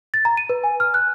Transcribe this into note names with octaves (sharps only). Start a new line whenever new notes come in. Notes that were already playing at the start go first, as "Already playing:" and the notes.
A6
A#5
D#7
B4
G#5
F6
F#6